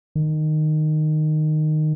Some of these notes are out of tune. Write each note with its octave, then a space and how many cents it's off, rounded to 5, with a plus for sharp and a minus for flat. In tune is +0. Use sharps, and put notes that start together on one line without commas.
D#3 -15